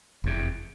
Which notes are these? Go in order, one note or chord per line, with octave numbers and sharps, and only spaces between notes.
F1 E2 C3